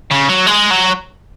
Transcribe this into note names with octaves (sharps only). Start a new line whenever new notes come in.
C#3
F#3
G#3
F#3